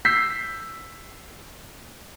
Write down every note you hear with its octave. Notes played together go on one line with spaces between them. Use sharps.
E6 G6 B6 C7